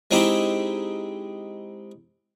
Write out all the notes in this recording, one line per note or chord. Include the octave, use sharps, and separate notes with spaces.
G#3 C4 D#4 E4 G4